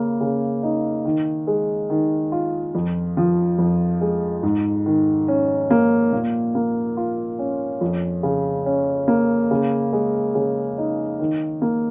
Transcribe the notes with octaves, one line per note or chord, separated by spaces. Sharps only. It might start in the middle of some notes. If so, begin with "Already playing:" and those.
Already playing: C#3 A#3
C#3
D#4
D#3
G#3
D#3
F4
F2
F3
F2
G#3
G#2
D#3
C#4
A#3
A#2
A#3
F4
C#4
F2
C#3
C#4
A#3
C#3
G#3
C#3
D#4
D#3
A#3